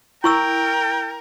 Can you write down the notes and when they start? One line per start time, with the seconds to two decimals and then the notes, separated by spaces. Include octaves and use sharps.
0.24 E4 A#4 G5 C#6 E6